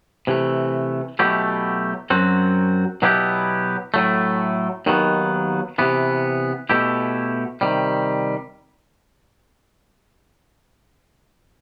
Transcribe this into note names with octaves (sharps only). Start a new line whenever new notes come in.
C3 E3 A3
B2 F#3 A3 E4 G4
F#2 F#3 C4 F#4
B2 F#3 B3 E4 G4
A2 F#3 A3
D#2 D#3 F#3 B3
C3 E3 B3
B2 A3 E4 G4
C3 D#3 G3